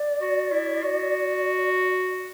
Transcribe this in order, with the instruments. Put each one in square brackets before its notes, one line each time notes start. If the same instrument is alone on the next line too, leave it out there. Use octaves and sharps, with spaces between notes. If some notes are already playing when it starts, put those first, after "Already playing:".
Already playing: [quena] D5
[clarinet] F#4
E4
F#4